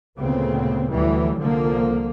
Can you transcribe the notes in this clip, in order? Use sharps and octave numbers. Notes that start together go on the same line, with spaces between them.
D2 A#2 C#3 B3 C4
D2 E3 F#3 G3
C2 D3 F3 A#3